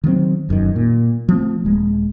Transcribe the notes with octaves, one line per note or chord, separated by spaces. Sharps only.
D#3 F#3 A3 C4
F1 F#2 C3 D#3
A#2
F3 A3 C4
D#1 G#3